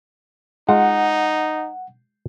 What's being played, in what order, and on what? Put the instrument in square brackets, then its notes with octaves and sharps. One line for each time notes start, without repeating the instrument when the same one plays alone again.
[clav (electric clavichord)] G#3 F4 [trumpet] D#4 [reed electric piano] F#5